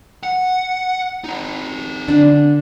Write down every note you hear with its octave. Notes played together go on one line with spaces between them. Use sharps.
F#5
C4 D#4
D3 D4